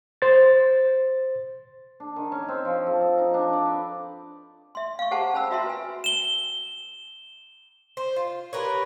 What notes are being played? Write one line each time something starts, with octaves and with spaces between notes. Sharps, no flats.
C5 A6
D4
D#3
C#4
C4
F3
A4
D#5
D#4
D4
D5
B4
E5 C6
F5 C#6
G4 G#4 C5 F#5 A5 A#5
C#4 C5 A5 B5 E6
F4 F#4 E5 A#5 C6
B4 G#5
E7 G7
C5
F4
G4 A#4 B4 C#5